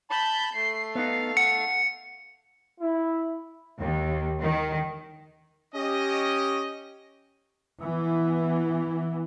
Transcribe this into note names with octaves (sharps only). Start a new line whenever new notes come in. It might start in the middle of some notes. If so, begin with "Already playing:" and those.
A5 B5 G6
A3 C7
B3 D#4 F5
F#5 C#7
E4
D#2
D#3
C#4 G4 D#5
E3 B3